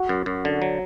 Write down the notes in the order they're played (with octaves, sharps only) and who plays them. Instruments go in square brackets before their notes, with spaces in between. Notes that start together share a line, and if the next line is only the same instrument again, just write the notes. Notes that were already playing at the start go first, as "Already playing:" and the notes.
Already playing: [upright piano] F#4
[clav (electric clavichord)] F#2
F#2
D3
F#3